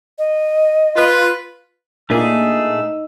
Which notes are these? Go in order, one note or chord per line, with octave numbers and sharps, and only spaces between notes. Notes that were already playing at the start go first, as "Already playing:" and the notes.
D#5
F4 B4
A#2 A3 A#3 D4 D#4 G#4 E6